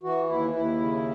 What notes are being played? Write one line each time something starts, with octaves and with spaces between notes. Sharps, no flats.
E3 F#4
D#2 E4
D#2 E4
C#3